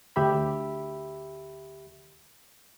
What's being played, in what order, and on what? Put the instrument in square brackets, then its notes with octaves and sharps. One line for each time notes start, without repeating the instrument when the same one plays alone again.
[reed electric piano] D2 G4 E5 B5